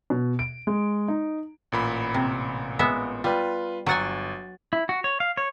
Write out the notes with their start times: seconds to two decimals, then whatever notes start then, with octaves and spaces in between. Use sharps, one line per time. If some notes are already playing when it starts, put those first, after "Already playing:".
0.10 B2
0.39 D7
0.67 G#3
1.08 D#4
1.72 A1 A#2 B5
2.14 C3
2.79 G#3 B3 E5
3.24 G3 F4 B4
3.86 G1 F#3 F#5 G#5 A6
4.73 E4
4.89 F#4
5.04 C#5
5.20 F5
5.37 C#5